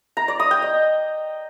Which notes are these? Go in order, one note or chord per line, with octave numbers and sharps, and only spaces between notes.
A#5
D5
D#6
G5
D#5